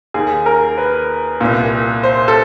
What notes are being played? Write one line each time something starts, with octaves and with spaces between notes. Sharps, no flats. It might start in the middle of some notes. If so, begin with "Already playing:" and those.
D#2 D#3 G#4
A#4
B4
C2 A#2
C5
A4